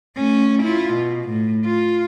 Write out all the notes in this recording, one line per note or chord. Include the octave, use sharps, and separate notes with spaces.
A3 C#4
E4 F4
B2
A2
F4